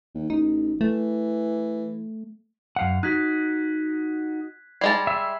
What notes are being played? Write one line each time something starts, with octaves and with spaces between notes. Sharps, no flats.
D#2
A1 D#4
E3 A3
F#2 F5 F#5
D#4 F#4 F#6 G#6 B6
G3 G#3 A5 G#6 C7
E5 E6